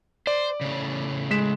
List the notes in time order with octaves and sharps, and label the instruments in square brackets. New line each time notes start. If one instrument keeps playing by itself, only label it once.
[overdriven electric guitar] C5 [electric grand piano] D5
[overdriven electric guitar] A2 C#3
[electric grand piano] G#3 B6 E7